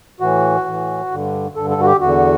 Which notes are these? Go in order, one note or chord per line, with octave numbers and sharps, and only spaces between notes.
A2 E3 F#4
A2 E3
G2 D3
G2 D3 A4
A4
F#4
G4
E2 D3 F#4